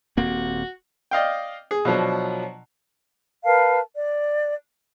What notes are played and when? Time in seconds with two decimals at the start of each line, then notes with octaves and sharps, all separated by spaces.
0.17 D#1 A#3 C4 F#4
1.11 D5 D#5 F5 G5
1.71 G#4
1.85 B2 F3 F#3 D4
3.45 A#4 B4 F5 A5
3.95 D5